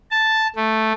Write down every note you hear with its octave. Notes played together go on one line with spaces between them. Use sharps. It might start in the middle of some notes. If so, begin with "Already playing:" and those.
A5
A3